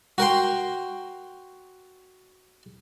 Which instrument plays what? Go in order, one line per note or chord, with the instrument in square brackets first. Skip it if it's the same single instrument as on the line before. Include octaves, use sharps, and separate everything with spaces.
[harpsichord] F#4 A#4 G5 C6